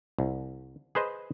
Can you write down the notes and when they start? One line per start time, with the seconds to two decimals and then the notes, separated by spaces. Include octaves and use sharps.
0.19 C2
0.95 G#4 B4 C5 D#5